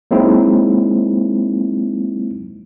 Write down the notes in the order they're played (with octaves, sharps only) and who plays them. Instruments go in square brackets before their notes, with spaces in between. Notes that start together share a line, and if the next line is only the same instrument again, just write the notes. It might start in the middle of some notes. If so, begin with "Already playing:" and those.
[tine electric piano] F#3 G#3 A#3 C4 D#4 E4